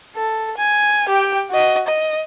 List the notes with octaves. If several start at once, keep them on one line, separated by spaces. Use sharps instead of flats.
A4
G#5
G4 G5
F#4 D#5
D#5